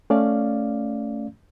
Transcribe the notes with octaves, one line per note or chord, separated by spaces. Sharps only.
A3 C#4 D5 F5